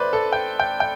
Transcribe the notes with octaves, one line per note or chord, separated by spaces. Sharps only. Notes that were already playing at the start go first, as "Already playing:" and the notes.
Already playing: A1 A3 B4 C5 D5
A4
G5
G5
G5